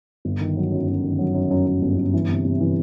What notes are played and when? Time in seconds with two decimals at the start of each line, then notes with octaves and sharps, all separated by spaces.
0.25 G1
0.41 D#3
0.57 F#3
0.72 F#2
0.88 F#2
1.03 D#3
1.19 F#3
1.34 F#2
1.50 F#2
1.67 F#2
1.82 G1
1.97 G1
2.14 E3
2.29 C3
2.45 C3
2.61 E3